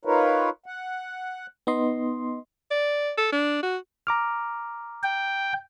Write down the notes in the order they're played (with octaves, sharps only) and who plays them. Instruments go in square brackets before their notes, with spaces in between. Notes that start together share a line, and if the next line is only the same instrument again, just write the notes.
[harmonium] D#4 F4 A#4 B4 C#5
F#5
[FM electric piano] B3 D#4 D#5 C6
[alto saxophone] D5
A4
D4
F#4
[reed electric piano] A#5 D6 F6
[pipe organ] G5